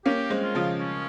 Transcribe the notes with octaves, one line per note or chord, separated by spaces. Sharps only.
A#3 C#4 G4
G#3 C4
F4
C#3 F3
C#4